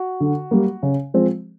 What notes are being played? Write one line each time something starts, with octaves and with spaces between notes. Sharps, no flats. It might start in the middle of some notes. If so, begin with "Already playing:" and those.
Already playing: F#4
D3
G3 A#3
C#3
F3 G#3 C4